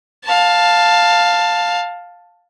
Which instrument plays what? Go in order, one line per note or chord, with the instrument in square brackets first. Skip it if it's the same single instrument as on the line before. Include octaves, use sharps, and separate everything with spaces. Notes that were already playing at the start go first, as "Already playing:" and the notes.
[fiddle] F5 A5